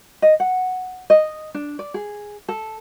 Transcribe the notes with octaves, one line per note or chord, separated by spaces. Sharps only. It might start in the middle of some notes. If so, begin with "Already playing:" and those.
D#5
F#5
D#5
D4
D5
G#4
A4